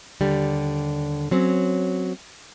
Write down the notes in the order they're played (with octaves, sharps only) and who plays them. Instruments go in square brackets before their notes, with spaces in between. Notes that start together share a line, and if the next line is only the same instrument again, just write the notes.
[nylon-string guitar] D#2 D3 G3
F#3 C4 C#4